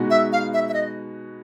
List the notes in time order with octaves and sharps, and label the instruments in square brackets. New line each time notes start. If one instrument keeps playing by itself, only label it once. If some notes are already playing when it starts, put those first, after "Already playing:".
Already playing: [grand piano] B2 G#3 B3 D#4 F#4
[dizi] E5
F5
E5
E5
D#5